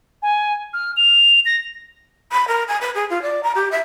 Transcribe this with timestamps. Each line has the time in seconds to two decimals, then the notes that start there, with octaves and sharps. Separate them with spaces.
0.22 G#5
0.74 F6
0.97 F7
1.46 A#6
2.32 B5
2.47 A#4
2.67 G#5
2.81 B4
2.94 G#4
3.09 F4
3.22 D5
3.43 A#5
3.55 G4
3.71 E5